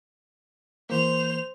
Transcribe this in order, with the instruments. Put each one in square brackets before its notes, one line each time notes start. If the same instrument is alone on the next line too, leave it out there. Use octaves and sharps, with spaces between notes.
[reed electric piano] E3 A#3 [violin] C5 F7